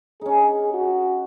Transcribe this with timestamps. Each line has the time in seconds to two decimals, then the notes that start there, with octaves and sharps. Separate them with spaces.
0.21 C#4 D#4 G#4
0.74 F#4